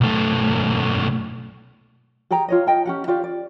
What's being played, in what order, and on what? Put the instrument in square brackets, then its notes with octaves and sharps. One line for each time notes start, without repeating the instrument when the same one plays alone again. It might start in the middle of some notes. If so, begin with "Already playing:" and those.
[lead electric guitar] B1 A3
[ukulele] G4 G#4 G5 A#5
F4 C#5 D#5
D#5 G5 A5
C#4 G4 F#5
F4 G4 D5
D5